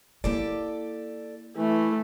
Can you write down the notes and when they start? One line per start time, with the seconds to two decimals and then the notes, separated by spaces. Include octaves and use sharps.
0.24 A#3 E4 G4 A4 D5
1.57 E3 A3